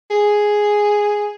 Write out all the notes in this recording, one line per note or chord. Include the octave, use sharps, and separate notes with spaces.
G#4